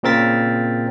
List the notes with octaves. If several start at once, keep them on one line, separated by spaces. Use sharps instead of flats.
A#2 C#3 C4 A#4 A6 B6